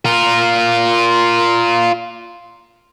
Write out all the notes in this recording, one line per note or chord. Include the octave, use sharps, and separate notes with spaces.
F4 A#4